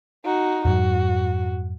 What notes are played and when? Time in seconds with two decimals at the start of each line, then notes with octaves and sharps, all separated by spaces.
0.25 D#4 F#4
0.65 F2 G#2 F#3 F#4